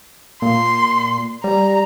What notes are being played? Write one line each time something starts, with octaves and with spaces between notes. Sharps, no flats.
A#2 C6
G3 A#5